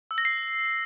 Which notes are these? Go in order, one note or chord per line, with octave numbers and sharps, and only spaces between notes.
E6
A#6
C7